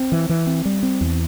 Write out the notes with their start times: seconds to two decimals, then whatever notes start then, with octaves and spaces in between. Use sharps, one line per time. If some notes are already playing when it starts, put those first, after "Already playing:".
Already playing: C4
0.12 E3
0.29 E3
0.47 C4
0.65 G3
0.83 C4
1.01 E2